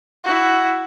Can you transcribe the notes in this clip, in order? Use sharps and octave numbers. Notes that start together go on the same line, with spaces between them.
E4 F#4